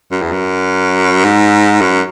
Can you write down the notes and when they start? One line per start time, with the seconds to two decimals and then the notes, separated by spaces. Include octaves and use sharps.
0.12 F#2
0.22 E2
0.32 F#2
1.25 G#2
1.81 F#2